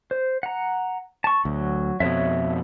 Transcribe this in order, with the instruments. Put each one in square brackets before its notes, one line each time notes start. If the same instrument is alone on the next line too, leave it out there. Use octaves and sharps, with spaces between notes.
[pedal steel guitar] C5
F#5 A#5
A5 C#6
[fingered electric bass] D2 [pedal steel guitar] F#3
[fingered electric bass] F2 B2 [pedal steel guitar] C#5 E5